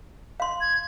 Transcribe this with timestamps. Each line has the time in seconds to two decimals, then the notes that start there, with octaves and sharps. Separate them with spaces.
0.40 F5 C6
0.61 G#6